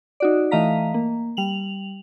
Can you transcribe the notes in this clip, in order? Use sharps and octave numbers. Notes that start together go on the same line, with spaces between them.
D#4 F#4 D5
E3 A3 D#5 F5 A#5 B6
A#3
G3 F7 F#7